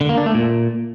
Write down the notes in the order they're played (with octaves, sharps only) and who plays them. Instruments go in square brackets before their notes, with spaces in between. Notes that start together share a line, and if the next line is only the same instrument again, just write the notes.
[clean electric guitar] D3
A#3
D4
A3
A#2